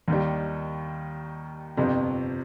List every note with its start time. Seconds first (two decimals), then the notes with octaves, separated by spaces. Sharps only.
0.08 D#2 D#3 G3
1.77 G1 F2 C3